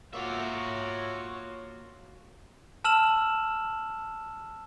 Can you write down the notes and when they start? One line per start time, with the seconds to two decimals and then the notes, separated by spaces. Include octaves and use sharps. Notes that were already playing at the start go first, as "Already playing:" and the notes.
0.13 A#3 F4 F#4 C#5 E5 F#5
2.84 A5 E6 F6 E7 F#7